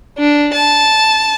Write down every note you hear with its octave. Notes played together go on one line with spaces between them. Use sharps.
D4
A5